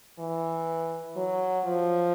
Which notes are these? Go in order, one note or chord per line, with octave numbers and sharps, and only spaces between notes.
E3
F#3
F3